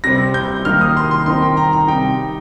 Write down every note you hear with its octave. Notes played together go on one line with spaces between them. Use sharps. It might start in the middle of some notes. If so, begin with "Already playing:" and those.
C3 G3 C4 A#6
G6
D#3 A#3 D#4 F6
D#6
C6
C6
D#3 C4 D#4 C6
G5
A#5
A#5
C3 G3 D#4 G5